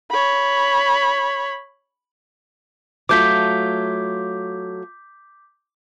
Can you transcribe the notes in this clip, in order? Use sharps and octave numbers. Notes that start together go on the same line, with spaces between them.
C#5 B5
F#3 A3 F4 D6 G6 B6